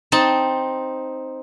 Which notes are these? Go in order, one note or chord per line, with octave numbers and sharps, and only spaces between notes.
C4 D#4 A5